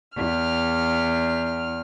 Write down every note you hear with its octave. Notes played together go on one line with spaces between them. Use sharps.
E2 F6